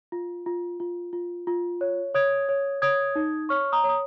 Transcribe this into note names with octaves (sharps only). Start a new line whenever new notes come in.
F4
F4
F4
F4
F4
C#5
C#5 D#6 G#6
C#5
C#5 D#6 G#6
D#4
C#5 C#6 F6
A#5 D#6
C#5
D#6